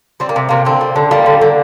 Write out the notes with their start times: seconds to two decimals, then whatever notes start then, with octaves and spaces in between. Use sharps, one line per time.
0.20 G3 C4
0.29 A#3
0.36 C3
0.49 C3 A#3
0.65 D3 C4
0.81 G3
0.96 D3
1.11 G3 A#3
1.26 D3
1.41 D3